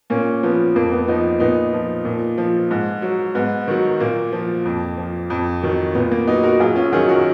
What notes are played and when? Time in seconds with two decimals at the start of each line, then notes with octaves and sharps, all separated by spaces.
0.10 A#2 A#3 C#4
0.43 F3 B3
0.75 F2 A#3
0.92 B3
1.08 F3 B3 D#4
1.40 A#2 B3 D#4
1.73 F3
2.05 A#2
2.38 F3
2.71 G#2
3.02 F#3
3.35 G#2 B3
3.68 D#3 F#3
4.00 A#2 A#3
4.32 F3
4.65 F2
4.97 F3
5.30 F2
5.63 D#3 F#3
5.95 A#2 B3
6.11 A#3
6.27 F#3 B3 D#4
6.43 F#4 A#4
6.60 F#2 F4 G#4
6.76 C#4 F4
6.93 D#3 F#3 F4 G#4
7.09 F#4 A#4